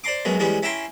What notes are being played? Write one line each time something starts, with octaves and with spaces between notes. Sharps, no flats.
C5 D5 A#5 C6 D6
F#2 B2 F#3 G#3
E3 G3 G#3 B3 C#4
C#4 E4 E5 G5 A#5 C6